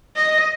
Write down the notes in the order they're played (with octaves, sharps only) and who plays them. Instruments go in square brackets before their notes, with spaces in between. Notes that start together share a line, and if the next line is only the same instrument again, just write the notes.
[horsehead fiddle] D#5